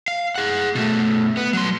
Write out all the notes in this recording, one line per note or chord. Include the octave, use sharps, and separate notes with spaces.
F5
G#4 F#5
B2 A3
B3
F#3 C6